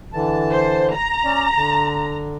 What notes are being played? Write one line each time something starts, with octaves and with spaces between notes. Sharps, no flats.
D3 E3 A5
C5
A#5
C#4 D5
D3